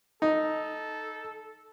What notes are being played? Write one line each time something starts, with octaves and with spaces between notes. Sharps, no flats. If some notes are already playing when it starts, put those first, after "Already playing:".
D#4 A4